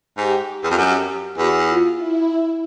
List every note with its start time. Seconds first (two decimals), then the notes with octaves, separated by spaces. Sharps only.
0.17 G#2 G4
0.64 E2
0.71 F2
0.78 F#2 G4
1.38 E2 F#4
1.68 F4
1.98 E4